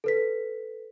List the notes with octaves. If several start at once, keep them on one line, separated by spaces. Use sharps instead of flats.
A4 B4 B6